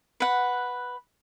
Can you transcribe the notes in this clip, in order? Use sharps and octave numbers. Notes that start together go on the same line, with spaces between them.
B4 F#5